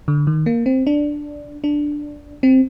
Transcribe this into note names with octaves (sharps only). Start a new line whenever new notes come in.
D3
D#3
A#3
C4
D4
D4
C4